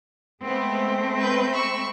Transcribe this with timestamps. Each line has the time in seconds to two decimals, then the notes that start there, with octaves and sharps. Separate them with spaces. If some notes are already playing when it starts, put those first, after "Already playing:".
0.44 G#3 A3 B3 C4
1.20 B4 G6
1.52 B5 C#6 E6